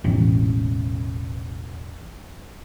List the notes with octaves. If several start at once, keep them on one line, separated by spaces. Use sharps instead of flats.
E1 A1